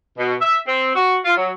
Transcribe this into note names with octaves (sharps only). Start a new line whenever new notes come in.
B2
E5
C4
F#4
F4
F#3